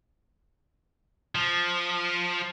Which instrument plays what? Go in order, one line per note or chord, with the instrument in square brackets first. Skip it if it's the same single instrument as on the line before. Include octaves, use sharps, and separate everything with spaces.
[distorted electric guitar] F3